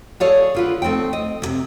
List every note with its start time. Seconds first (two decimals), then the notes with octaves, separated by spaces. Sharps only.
0.20 G#4 A4 C#5 D5 F5
0.55 D3 F4 B4
0.82 A3 C4 D#4 G5
1.13 D#5
1.42 D#2 C3